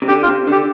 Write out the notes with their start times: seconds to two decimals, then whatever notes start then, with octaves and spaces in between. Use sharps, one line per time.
0.02 C3
0.08 D3 G4
0.23 F4
0.28 C3
0.47 D3 G4